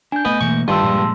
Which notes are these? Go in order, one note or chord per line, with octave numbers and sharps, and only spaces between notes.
D4 G#5 G6
A3 B3 D#5
B2 E3 A#3 C#6
G2 D#3 D#4 F4 A5 C6 E6
A#2 F3 G#3